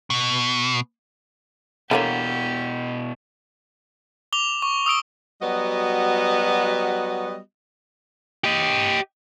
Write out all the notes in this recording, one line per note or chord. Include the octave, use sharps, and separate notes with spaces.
B2
B2 D3 E3 A#3 G4 C#5
D6 F7 G7
C#6
D#6 E6 D7 G7
F#3 G3 B3 F#4 D#5
G4 D#5